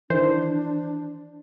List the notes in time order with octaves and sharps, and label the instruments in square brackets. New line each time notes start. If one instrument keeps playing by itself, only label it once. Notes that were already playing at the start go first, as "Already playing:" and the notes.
[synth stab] D#3 E3 C5 [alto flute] D4